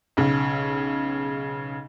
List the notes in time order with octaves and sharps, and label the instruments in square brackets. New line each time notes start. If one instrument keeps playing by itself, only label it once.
[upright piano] B1 C#3